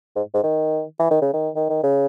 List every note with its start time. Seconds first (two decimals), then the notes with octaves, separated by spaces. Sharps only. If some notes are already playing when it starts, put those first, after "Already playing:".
0.16 G#2
0.34 G#2
0.44 D#3
0.99 E3
1.11 D#3
1.22 C#3
1.33 D#3
1.56 D#3
1.70 D#3
1.83 C#3